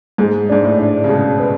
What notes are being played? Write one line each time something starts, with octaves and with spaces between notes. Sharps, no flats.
G#2 G#3
G#2 D4
A2
D4
C#3
B2 G#3
B4